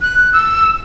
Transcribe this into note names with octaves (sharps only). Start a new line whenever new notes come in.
F#6
E6